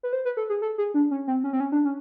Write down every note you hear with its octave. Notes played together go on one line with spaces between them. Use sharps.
B4
C5
B4
A4
G#4
A4
G#4
D4
C#4
C4
C#4
C4
C#4
D4
C#4